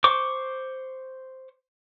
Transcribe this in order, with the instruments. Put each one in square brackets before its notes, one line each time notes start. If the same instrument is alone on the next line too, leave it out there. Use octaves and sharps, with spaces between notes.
[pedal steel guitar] C5 C#6 D6